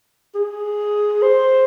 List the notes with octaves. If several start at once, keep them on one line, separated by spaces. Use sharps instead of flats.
G#4
C5